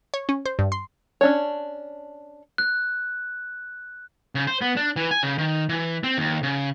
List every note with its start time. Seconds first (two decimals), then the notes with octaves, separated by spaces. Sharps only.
0.14 C#5
0.29 C#4
0.46 C5
0.59 G2
0.72 C6
1.21 C#4 D4 C#5
2.58 F#6
4.35 C#3
4.47 C5
4.61 B3
4.76 D4
4.96 E3
5.11 G#5
5.23 C#3
5.38 D#3
5.69 E3
6.04 C4
6.18 D#2
6.43 C#3